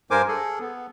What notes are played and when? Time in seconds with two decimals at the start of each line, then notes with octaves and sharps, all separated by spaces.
0.11 G2 A#4 C5 G#5 D6
0.28 G#4 A4
0.60 B3